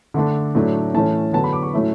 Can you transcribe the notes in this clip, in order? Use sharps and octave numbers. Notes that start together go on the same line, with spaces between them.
D3 A3 D4
A2 F#3 A3 D4
A2 E3 A3 C#4 A5
D3 F#3 B3 A5
B5
D6
C#6
A2 F#3 A3 C#4 E4